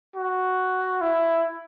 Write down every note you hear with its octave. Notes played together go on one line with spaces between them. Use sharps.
F#4
E4